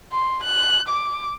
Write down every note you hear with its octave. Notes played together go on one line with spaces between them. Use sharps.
C6
F#6
D6